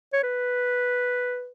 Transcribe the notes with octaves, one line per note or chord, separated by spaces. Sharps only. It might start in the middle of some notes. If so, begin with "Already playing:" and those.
C#5
B4